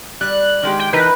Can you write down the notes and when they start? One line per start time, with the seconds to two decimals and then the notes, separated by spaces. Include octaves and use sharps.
0.21 G3 F#6
0.63 D#3 G#3 G4
0.79 G5
0.93 E3 D#4 A#4 B4